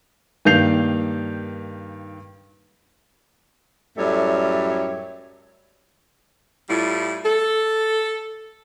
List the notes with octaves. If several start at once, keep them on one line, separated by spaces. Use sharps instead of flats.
G2 D#3 A#3 G6 C7 F7
F#2 A2 G3 A3 C#5 E5
A2 G3 E4 F4
A4